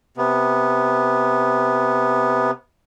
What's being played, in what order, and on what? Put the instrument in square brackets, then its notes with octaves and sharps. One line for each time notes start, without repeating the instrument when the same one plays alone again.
[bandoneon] C3 B3